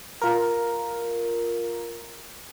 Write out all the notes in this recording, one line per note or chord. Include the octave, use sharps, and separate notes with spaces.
F4 A#4